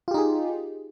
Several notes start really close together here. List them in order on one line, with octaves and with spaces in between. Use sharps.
F4 G4 D#4 G#4